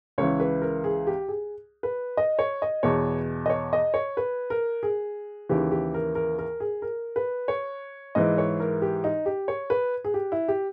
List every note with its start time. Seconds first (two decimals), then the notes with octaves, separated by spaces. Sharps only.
0.18 C#2 C#3 E3 C#5
0.40 B4
0.62 A#4
0.84 G#4
1.07 G4
1.28 G#4
1.83 B4
2.17 D#5
2.39 C#5
2.62 D#5
2.83 E2 B2 C#5
3.46 D#5
3.50 C#5
3.73 D#5
3.94 C#5
4.17 B4
4.50 A#4
4.83 G#4
5.49 D#2 C#3 E3 G4
5.71 G4
5.94 A#4
6.15 A#4
6.38 A#4
6.60 G#4
6.82 A#4
7.16 B4
7.48 C#5
8.15 G#2 E3 D#5
8.38 C#5
8.60 A#4
8.82 G4
9.04 D#4
9.26 G4
9.48 C#5
9.70 B4
10.05 G#4
10.14 G4
10.32 E4
10.48 G4